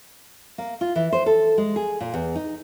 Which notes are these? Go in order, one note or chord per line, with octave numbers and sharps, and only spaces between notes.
A#3
F4
E3
C5
A4
G#3
G#4
A#2
E2
D#4